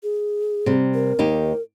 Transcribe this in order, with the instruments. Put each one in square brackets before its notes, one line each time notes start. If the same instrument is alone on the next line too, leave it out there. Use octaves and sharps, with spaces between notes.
[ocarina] G#4
[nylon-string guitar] C3 G3
[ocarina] A#4
[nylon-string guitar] D#2 D#4 G4